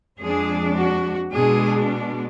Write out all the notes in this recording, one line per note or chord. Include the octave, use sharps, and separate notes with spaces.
F2 F3 G#3 D4 G#4
F#4
B2 G#3 D4 G#4